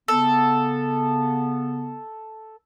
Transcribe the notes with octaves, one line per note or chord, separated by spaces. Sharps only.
C#3 B3 A4